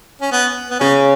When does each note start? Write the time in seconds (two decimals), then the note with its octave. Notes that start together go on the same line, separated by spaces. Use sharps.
0.22 C#4
0.32 B3
0.70 B3
0.80 C#3 C#4